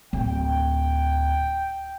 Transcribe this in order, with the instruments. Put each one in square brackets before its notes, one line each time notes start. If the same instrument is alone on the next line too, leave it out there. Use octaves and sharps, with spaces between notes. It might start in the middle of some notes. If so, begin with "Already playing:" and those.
[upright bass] D1 [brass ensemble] G5